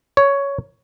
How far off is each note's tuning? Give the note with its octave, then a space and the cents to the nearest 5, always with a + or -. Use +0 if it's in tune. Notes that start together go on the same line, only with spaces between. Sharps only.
C#5 +10